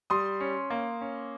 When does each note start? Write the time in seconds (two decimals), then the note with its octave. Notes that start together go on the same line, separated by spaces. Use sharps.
0.10 G3 C6 D#6
0.40 C#4
0.70 A#3
1.01 C#4